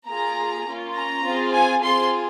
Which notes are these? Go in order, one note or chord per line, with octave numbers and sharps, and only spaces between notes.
A#3 F4 G#4 A#5
A#3 C#4 F4
A#5
C4 F4 G#4
G#5
C4 F4 G#4 C6